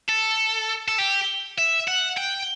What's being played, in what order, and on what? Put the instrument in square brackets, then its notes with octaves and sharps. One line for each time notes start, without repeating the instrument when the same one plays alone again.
[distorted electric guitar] A4
A4
G4
E5
F#5
G5